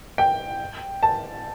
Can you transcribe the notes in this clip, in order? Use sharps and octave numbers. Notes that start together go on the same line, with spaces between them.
G5
A5